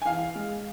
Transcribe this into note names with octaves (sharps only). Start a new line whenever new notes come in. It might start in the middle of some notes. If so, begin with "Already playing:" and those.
G#5
E3 F5
G#3